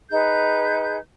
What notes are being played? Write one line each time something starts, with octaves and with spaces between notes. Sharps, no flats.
D#4 G#4 B4 G6